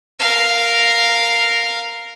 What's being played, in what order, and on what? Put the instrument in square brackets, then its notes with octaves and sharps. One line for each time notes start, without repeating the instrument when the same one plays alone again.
[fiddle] A#4 F5